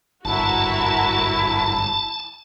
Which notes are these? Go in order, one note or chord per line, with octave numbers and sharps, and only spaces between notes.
G1 E4 F#4 A#4 E5 A5